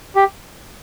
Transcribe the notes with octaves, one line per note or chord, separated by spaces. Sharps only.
G4